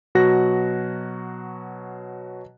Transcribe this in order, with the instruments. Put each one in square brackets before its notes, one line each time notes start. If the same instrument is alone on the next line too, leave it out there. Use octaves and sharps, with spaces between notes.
[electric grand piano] B2 F#3 F#4 F#6 A#6